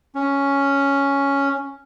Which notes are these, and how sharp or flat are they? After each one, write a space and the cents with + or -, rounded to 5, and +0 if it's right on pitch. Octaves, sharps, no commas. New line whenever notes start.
C#4 +5